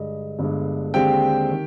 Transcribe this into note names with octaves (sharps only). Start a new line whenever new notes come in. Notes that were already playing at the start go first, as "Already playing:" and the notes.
Already playing: G2 D3 G#3 D#5
G1 G2 D3 G#3
D#2 D3 G#3 C4 G4 G5
D#3